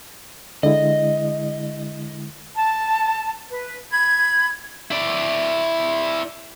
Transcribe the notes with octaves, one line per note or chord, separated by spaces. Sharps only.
D3 G#3 E4 D#5
A5
B4
B5 G#6
E4 D5